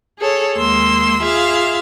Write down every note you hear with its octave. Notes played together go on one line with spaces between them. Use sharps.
G#4 A4 C#5
D#2 G#3 A#3 C6 E6
F4 G#4 E5 F5